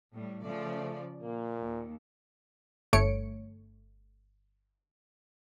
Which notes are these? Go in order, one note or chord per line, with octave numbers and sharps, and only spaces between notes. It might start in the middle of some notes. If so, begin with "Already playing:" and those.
A2 G3
C#3 F3 A3 D5
A#2 A#3
D#2
G1 A3 C#5 C#7 D7